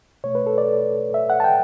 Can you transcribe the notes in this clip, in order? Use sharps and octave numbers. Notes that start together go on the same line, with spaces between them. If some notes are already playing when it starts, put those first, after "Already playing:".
B2 A3 C#5
B4
A4
D5
E5
F#5
A5
G5